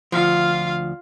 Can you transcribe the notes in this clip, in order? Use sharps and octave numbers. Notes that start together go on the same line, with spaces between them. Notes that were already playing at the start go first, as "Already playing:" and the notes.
D2 F3 F4 F5